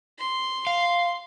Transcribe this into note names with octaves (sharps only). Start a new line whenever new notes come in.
C6
F5